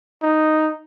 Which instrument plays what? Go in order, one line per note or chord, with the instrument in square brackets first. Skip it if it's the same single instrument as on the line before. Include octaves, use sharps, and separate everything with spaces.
[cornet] D#4